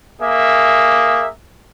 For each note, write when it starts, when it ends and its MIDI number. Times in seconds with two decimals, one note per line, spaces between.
0.21 1.25 58
0.21 1.25 68
0.21 1.25 76